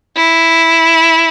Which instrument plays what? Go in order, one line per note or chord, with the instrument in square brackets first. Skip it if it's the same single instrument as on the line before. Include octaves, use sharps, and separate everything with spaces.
[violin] E4